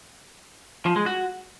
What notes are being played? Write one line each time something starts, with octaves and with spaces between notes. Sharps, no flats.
F3
G#3
F#4